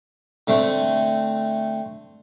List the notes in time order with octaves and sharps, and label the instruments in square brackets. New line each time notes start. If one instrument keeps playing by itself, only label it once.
[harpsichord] D3 A3 C4